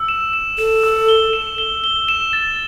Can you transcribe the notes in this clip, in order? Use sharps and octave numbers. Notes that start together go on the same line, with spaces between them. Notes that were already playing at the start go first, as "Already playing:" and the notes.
Already playing: E6
E7
E7
A4 E7
E6
G7
E7
G7
G7
E7
A6